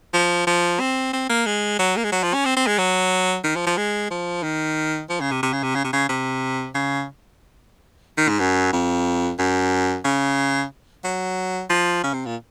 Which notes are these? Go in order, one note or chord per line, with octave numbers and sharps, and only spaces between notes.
F3
F3
C4
C4
A#3
G#3
F#3
A#3
G#3
F#3
F3
C#4
C4
C4
G#3
F#3
D#3
F3
F3
G#3
F3
D#3
F3
C#3
C3
C3
C#3
C3
C#3
C3
C#3
C3
C#3
D#3
G#2
F#2
F2
F#2
C#3
F#3
F3
C#3
C3
A#2